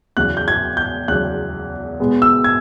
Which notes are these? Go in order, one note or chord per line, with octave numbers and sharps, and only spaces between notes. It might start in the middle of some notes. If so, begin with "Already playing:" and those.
E2 C#3 F#3 F#6
G6
G#6
G6
E2 C#3 F#3 F#6
B2 G#3 B3
E6
G#6